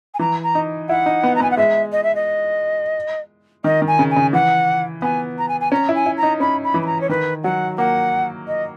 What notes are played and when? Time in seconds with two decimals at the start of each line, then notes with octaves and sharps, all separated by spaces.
0.14 G#5
0.19 E3 A#5
0.43 A#5
0.55 D#4
0.89 E4 F#5
1.06 D#4
1.23 B3
1.35 A#5
1.40 B3 G#5
1.51 F#5
1.57 G#3 E5
1.92 D#5
2.03 E5
2.15 D#5
3.64 D#3 D#5
3.82 D#3
3.87 G#5
3.99 C#3
4.10 G#5
4.16 C#3
4.33 E3 F#5
5.02 B3 G#5
5.38 A#5
5.48 G#5
5.61 G#5
5.72 C#4 A#5
5.89 E4
5.95 G#5
6.06 E4
6.17 A#5
6.23 D#4
6.40 C#4 B5
6.64 B5
6.74 E3
6.82 B5
6.86 A#5
7.01 C#5
7.09 D#3 B4
7.43 F#3 F#5
7.78 A#3 F#5
8.47 D#5